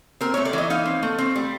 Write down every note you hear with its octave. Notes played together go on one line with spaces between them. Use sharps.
C4 A#4
A3 C#5
D5
E3 D#5
D#4 F5
C4
A3
C4
G3